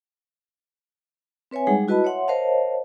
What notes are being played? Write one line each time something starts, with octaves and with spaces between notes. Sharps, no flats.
C4 B4 C#5 E5 G#5
G3 G#3 D#4 G#4 F#5
E4 F#4 B4 D#5 A5 B5
C#5 E5 F#5 C6
A#4 C5 C#5 D#5 F5 A5